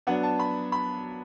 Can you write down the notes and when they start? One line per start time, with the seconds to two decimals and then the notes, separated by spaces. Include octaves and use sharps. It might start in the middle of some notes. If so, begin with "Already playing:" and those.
0.07 F#3 B3 D4 F#5
0.23 A5
0.39 B5
0.72 B5